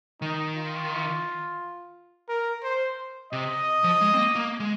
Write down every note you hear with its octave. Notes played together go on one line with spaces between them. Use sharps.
D#3 D#4
F4
A#4
C5
C3 D#5
F3
G#3
C4
A#3
A#3
G#3